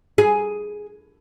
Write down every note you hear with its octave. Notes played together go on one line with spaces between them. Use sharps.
G#4